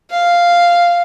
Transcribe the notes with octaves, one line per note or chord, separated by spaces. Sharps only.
F5